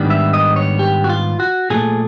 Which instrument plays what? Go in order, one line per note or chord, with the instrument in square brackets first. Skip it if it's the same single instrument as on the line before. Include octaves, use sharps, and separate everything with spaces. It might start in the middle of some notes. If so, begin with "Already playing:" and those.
Already playing: [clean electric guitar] G#2 D#3 G3 B3 D4
E5
D#5
C#5
G4
F#4
F4
F#4
A#2 F3 A3 G#4